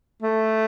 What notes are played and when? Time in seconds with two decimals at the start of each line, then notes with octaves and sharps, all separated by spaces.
0.22 A3